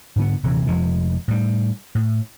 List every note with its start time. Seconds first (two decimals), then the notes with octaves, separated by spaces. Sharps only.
0.16 G#2 D3 B3
0.43 D#1 C3 E3
0.67 F1 F2 F3 G#3
1.28 A2 G3
1.95 A2